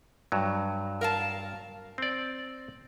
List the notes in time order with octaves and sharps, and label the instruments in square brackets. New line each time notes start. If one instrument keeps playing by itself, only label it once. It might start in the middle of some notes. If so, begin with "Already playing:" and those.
[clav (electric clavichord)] G2 F#3
[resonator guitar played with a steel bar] A#4 F5 A5
[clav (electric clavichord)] C4 D5